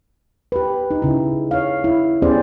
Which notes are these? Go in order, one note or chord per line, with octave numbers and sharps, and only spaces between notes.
G4 B4
D#4
C#3 E4
C#5 F5
E4
B3 C#4 G4 G#4 C5 D5